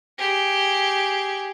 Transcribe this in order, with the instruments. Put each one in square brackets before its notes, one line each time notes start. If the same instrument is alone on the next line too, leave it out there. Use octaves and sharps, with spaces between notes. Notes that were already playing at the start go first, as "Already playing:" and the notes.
[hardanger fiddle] G4 G#4